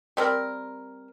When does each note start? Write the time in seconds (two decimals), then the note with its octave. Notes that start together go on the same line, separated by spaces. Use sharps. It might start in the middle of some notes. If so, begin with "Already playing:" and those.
0.17 G3 C4 A#4